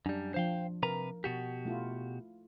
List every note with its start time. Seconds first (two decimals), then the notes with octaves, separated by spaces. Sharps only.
0.06 F#2 G3 D4
0.34 F3 D4 C5 F5 G5
0.83 C3 A#4 B4 A#5
1.24 B2 F#4 G4
1.65 A3 E4 F4